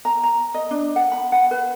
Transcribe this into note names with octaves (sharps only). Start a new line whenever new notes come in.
A#5
A#5
D#5
D4
F#5
B5
F#5
B4